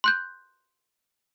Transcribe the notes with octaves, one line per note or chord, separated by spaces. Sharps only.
C6 F#6 G6